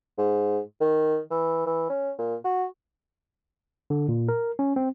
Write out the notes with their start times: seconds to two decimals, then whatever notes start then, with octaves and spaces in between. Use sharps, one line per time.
0.18 G#2
0.81 D#3
1.31 E3
1.66 E3
1.90 C#4
2.19 A#2
2.45 F#4
3.90 D3
4.09 A#2
4.29 A#4
4.59 C#4
4.76 C4